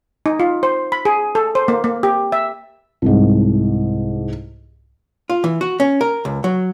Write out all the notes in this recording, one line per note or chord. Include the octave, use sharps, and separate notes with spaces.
D#4
F4
C5
B5
G#4
A4
C5
A#3
A#3
G4
E5
C2 G#2
F4
E3
F#4
C#4
A#4
C#2
F#3